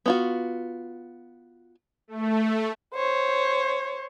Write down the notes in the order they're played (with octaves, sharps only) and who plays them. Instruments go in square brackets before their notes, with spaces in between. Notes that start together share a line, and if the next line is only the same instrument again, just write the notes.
[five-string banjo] B3 F4 F#4
[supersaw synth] A3
[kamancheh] C5 C#5